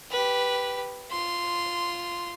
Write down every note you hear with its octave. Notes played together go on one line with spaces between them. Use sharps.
G4 B4
F4 C6